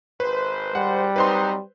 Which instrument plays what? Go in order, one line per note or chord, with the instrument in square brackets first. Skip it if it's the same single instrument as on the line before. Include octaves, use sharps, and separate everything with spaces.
[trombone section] G#1 C5 [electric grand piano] B4
[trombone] G3 [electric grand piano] F#5
[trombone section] F#3 C4 D#4 [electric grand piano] B4 C5 C6